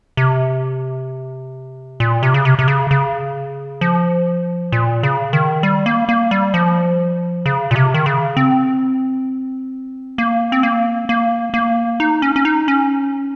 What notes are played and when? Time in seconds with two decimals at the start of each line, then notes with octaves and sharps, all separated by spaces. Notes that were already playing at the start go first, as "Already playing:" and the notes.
0.17 C3
2.00 A#2
2.23 C3
2.34 C#3
2.45 C3
2.59 C3
2.68 C#3
2.91 C#3
3.81 F3
4.72 A#2
5.03 C#3
5.33 D#3
5.63 G3
5.86 A#3
6.09 A#3
6.31 G3
6.54 F3
7.46 C#3
7.71 A#2
7.76 C3
7.94 D#3
8.06 C#3
8.37 C4
10.18 A#3
10.52 C4
10.63 A#3
11.09 A#3
11.54 A#3
12.00 D#4
12.22 C#4
12.36 C#4
12.45 D#4
12.68 C#4